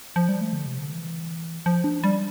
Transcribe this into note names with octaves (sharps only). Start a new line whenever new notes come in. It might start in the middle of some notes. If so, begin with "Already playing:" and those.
F3
G3
A3
D3
C3
D3
E3
F3
D4
G3